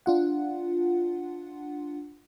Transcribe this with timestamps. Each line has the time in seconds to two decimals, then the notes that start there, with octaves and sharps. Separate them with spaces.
0.06 D4 F4 F#5